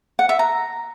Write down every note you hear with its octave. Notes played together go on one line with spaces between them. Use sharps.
F#5
E5
A#5